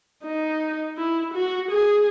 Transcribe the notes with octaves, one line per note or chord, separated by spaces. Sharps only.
D#4
E4
F#4
G#4